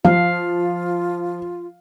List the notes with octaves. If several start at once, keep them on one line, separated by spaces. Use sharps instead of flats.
F3 F4 F5